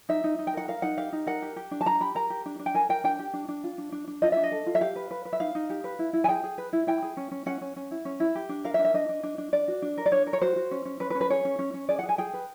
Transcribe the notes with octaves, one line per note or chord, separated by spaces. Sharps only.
D#4 E5
D#4
D#4
G5
A#4 F#5
A#4 F5
D#4 F#5
G4 F5
D#4
A#4 F#5
G4
G4
D4
A5
D4 A#5
G4 B5
A#4 A#5
G4
D4
D4
G5
A#4 G#5
A#4 G5
D4 G5
G4
D4
D4
F4
D4
D4
D4
F4 D#5
D4 E5
D#5
A4
F4
E5
G4 F5
B4
B4
B4
E5
D#4 F5
D#4
G4
B4
E4
E4
G#5
G#4 G5
G#4
B4
E4
E4 G5
G#4
C#4
C#4
C#4 F#5
C#4
C#4
E4
C#4
E4
G4
D4
A#4 F5
E5
D4
E5
D4 D#5
D4
D4
D4
D4 D5
F#4
D4
A#4
D5
D4 C#5
A#4
C#5
F#4 C5
F#4
C#4
C#4
C#4 B4
B4
C#4
B4
G#4 C#5
C#4
C#4
C#4
G#4 D5
G#4 F#5
G#5
G#4 G5
B4